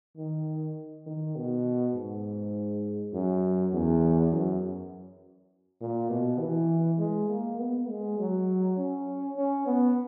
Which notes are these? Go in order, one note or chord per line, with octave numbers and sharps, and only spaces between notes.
D#3
D#3
B2
G#2
F#2
E2
F#2
A#2
B2
E3
G#3
A#3
B3
G#3
F#3
C#4
C#4
B3